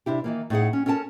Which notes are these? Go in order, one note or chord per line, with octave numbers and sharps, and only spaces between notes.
C3 D4 E4 G4
D#3 E3 A#3
A2 D#4 G#4 F#5
C#4
C#4 A4 A#4 G5 A5